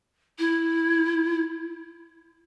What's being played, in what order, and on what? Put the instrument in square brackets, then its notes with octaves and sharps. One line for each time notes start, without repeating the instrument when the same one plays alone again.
[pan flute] E4